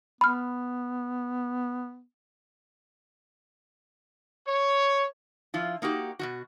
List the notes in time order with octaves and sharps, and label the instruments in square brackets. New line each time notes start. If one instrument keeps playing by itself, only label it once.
[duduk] B3 [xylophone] B5 F6
[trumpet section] C#5
[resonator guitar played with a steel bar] F3 E4 F4
A#3 D#4 F#4 G4
B2 D#3 F#4